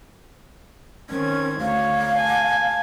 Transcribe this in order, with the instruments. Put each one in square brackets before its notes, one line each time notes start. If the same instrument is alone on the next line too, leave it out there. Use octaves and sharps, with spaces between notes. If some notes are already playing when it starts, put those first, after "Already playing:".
[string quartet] D#3 C4 G#6 [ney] C#4
[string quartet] D2 C#5 [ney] F5
[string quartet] G#5 A5